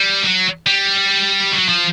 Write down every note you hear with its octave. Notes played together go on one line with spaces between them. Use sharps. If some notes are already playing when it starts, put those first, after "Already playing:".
Already playing: G3
F#3
G3
F#3
F3